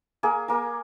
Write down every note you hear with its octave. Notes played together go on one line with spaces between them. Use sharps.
A#3 G#4
A#3 A#4